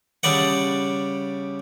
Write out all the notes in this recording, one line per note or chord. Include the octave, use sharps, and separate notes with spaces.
C#3 G3 D5 F#5